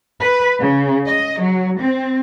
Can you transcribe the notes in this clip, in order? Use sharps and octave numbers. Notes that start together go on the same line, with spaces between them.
B4
C#3
D#5
F#3
C4